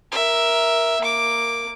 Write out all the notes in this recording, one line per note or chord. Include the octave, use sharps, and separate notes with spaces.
A#4 E5
A#3 D6